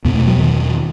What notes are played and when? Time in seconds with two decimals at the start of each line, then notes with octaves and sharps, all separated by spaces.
0.05 E2 B2 B3
0.15 A3
0.27 F#3
0.39 D#3